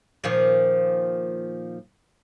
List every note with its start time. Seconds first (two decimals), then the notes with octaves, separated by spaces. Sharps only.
0.24 A#2 D#3 F3